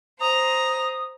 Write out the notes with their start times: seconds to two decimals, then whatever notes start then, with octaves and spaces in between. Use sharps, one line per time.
0.21 C5 A#5 D#6